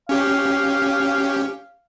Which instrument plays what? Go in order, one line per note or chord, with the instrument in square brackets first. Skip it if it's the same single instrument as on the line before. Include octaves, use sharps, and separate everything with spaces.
[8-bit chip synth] C#4 G4 [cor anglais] F5